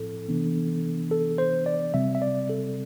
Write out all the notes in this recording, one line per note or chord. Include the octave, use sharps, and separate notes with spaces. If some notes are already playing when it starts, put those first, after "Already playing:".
Already playing: A2 F3 C4 E4 A4
C3 E3 B3 D4
A4
C5
D5
C3 G3 C4 E5
E5
D5
A4